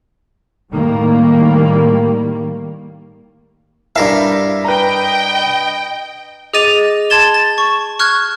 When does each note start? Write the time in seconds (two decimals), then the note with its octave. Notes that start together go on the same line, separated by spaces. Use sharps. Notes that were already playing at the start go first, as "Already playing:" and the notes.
0.72 A2 D#3 G3 A#3
3.96 G2 E4 A#4 E5 F5
4.64 B4 D#5 G5 A#5
6.53 G#4 D#5 D6 A6 D#7 F7
7.10 A5 C6 G#6 A6 E7 G7
7.34 A6
7.58 C#6
7.99 C#6 F6 F#6 G#6